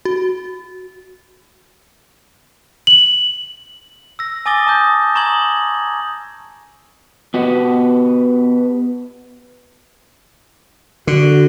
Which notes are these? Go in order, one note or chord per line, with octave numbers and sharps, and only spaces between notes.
F#4
F#7
E6 A#6
G#5 D6 D#6 A6 A#6 G7
A5 D#6 G6
A#5 C#6 D#6 G#6 F#7
B3 F#4 G4 B4
D3 F#4